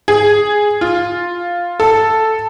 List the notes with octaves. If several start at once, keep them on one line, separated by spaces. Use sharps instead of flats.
G#4
F4
A4